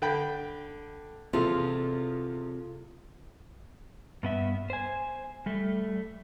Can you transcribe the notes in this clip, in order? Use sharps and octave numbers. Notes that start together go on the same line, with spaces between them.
D3 G5 B5
E2 C3 F3 C4 F4 G#4 A4
G2 B3 E5
C5 G#5
G3 A3